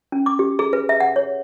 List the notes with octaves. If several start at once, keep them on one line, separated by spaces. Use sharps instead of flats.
C#4
D6
G4
G#4
B4
E5
F#5
C#5